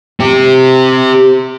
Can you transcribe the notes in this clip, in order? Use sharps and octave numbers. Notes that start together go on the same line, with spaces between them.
C4 G4